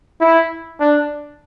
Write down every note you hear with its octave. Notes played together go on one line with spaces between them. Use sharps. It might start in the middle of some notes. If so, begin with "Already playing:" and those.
E4
D4